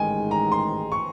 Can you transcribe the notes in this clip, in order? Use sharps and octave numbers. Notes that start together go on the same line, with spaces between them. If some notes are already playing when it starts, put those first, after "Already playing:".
Already playing: A1 G#2 D#3 G#3 G5 G#5
A#5
C6
C#6